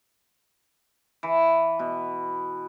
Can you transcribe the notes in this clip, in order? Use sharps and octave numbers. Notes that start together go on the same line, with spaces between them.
E3
B2